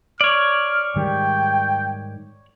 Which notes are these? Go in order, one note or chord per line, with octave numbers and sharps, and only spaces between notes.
C#5 D5 F6
G#2 D#3 G3 G5